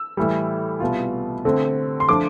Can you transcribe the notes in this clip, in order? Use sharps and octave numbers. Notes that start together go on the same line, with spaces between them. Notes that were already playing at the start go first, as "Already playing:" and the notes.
Already playing: E6
A2 E3 G3
C2 B2 B3 F4
D3 A3 C4
C6
F3 A3 D4 F4 D6